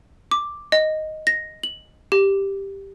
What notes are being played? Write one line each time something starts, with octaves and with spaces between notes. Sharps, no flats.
D6
D#5
A#6
F#7
G4